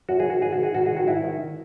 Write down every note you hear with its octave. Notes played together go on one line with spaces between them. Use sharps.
F#2 F#4
G#4
D#3 F#4
G#2 G#4
F#4
D#3 G#4
G#2 F#4
G#4
D#3
F#4
G#2 E4
D#3